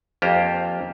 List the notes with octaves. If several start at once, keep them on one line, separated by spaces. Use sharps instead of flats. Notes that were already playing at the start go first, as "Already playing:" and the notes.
F2 A#3 F4 G4 C5 A#5